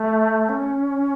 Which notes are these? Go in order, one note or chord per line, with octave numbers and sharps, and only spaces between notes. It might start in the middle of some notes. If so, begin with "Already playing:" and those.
Already playing: A3
C#4